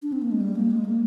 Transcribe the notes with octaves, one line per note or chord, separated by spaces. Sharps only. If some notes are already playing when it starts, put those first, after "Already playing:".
D4
C4
A#3
G#3
G3
A#3
G#3
A#3